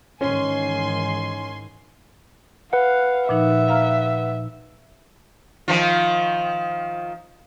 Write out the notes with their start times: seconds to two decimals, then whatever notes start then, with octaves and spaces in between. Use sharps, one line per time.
0.21 G#2 D#3 E3 C#4 G#5 C6
2.73 B4 F5 F#5
3.29 A#2 F3 D#4 E5
3.68 F5 A#5 F6
5.68 D#3 F3 F4